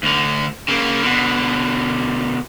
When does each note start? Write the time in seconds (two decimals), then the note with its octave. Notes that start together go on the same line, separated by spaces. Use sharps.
0.03 D2 D3
0.68 C#3 A#3
1.02 B2 D3